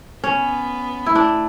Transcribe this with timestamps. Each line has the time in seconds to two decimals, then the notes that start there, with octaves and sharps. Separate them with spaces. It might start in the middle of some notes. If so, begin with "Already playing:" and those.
0.23 B3 C#4
1.06 E4
1.15 A3 D4